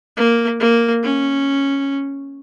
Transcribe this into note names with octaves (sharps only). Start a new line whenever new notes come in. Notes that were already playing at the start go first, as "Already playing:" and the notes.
A#3
A#3
C#4